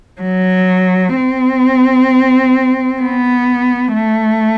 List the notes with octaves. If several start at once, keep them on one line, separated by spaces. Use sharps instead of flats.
F#3
C4
B3
A3